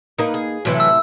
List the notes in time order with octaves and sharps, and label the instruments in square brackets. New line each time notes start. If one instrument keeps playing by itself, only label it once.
[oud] A#3 D#4 [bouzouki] A#4 B4
[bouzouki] G#4
[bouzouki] A2 C3 E4 [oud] E3 F#3
[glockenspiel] E6